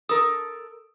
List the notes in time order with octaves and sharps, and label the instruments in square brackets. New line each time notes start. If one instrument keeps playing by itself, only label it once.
[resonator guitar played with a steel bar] A4 A#4 [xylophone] D#6